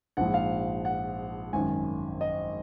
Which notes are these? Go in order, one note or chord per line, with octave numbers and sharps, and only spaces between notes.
A#1 G#2 F3 F#5
F5
F#5
G#1 F#2 D#3 G#5
D#5